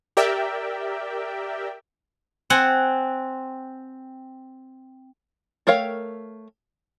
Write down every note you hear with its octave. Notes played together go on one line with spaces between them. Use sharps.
G4 A#4 D5 E5 G5
C4 F#5 G#5
A3 A#4 C#5 F5 G5